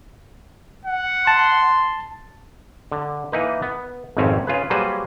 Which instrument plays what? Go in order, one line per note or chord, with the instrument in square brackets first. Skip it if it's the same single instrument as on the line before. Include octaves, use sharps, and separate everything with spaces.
[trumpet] F#5
[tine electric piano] A5 [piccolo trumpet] C6
[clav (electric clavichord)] D3
E3 A#3 D#4 B4
B3
G#1 F2 G#2 B2 C4 C#4
C#3 F4 G#4 B4
F#3 G3 A#3 G#4 B4 C5